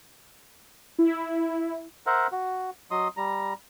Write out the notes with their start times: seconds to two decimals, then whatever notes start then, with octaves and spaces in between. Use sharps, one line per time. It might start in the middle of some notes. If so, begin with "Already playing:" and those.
0.99 E4
2.06 A#4 C5 E5 F#5
2.32 F#4
2.91 F#3 D#5 C6 D#6
3.17 G3 A#5